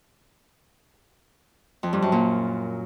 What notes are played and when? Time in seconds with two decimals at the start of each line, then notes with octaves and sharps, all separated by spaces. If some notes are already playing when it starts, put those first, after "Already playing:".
1.83 F2
1.93 G2
2.02 F#2
2.12 A#2